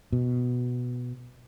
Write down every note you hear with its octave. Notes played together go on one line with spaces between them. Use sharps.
B2